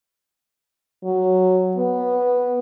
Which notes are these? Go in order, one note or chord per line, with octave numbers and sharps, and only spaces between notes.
F#3
B3